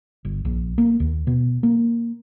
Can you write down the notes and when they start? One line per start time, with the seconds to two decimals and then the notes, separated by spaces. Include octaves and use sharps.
0.25 G1
0.45 A#1
0.78 A#3
1.00 D#2
1.27 B2
1.63 A#3